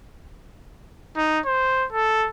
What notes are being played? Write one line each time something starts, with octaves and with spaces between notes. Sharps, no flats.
D#4
C5
A4